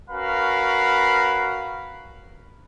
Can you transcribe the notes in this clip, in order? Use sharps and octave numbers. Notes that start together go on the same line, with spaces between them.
C#4 F#4 A#4 B4 F5 B5